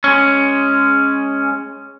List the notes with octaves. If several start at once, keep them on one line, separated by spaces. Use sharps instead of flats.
G#3 C#4